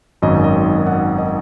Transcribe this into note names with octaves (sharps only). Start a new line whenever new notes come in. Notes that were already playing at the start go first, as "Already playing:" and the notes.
G#1 F#2 D#3 D#5
D#5
D#5
F#5
D#5